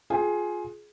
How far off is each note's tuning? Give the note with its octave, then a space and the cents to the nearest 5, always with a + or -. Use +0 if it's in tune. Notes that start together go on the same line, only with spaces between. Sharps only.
F4 +15 G#4 +15 G5 +35